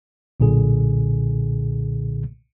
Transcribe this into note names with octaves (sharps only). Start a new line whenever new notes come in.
B1 A#2 D3 G#4